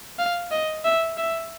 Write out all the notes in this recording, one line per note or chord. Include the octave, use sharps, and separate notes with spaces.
F5
D#5
E5
E5